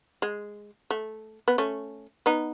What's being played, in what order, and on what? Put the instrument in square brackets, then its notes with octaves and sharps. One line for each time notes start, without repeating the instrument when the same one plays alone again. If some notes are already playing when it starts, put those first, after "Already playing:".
[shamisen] G#3
A3
B3
A3 C#4
B3 D#4